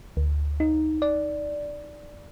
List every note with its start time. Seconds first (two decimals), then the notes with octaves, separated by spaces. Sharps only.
0.17 D2
0.60 D#4
1.02 D5